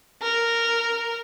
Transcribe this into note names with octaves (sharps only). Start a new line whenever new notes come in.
A#4